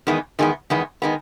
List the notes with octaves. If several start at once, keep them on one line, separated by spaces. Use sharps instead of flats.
E2 D#3 G#3 B3
E2 D#3 G#3 B3
E2 D#3 G#3 B3
D#3 G#3 B3